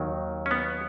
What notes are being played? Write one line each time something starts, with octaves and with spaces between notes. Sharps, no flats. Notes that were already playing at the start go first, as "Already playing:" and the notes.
Already playing: D#2 D#3 F#3
C#4
B3